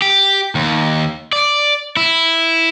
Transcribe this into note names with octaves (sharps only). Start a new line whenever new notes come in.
G4
D#2
D5
E4